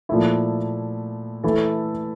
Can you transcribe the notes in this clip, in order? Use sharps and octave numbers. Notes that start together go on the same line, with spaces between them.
A#2 F3 A3 E4
E3 A3 E4 A4